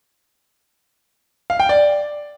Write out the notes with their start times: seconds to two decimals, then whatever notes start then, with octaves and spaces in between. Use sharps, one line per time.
1.50 F5
1.60 G5
1.69 D5